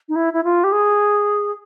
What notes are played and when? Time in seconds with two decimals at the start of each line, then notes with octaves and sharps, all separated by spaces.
0.09 D#4
0.16 E4
0.33 E4
0.44 F4
0.64 G4
0.72 G#4